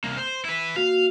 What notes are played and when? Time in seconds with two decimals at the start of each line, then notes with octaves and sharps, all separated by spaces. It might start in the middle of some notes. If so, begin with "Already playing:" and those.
0.04 C2 A#3
0.17 C5
0.45 E4 B4
0.76 A#3 F#4 F5